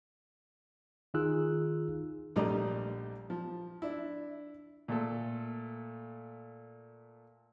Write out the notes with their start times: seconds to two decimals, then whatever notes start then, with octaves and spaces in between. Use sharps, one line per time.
1.14 D#3 D#4 F4 G#4 E6 F#6
2.36 A#1 G3 A3 D5 D#5 A#5
3.30 F3
3.82 D4 E4
4.88 A#2 A3 A4